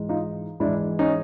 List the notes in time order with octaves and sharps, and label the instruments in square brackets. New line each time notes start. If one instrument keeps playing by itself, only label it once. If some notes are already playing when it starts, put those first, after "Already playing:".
Already playing: [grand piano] G#2 E3
D#4 F4
G#2 E3 D4 E4
C#4 D#4